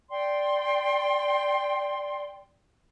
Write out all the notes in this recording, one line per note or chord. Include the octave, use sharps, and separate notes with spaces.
D5 G5 C6